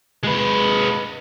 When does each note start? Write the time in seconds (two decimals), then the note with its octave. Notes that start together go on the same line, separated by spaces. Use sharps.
0.23 G#3 B4